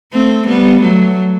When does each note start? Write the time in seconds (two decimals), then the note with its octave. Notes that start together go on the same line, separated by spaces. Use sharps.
0.12 A3 C4
0.47 G3 B3
0.82 F#3 A3